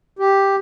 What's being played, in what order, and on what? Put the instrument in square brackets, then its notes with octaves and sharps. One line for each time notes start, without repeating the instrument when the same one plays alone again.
[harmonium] G4